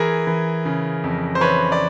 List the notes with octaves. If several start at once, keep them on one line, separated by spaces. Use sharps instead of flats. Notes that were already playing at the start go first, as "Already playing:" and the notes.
Already playing: E3 G#4 A#4
E3
C#3
F2
C5
E3 B4 C#5
D5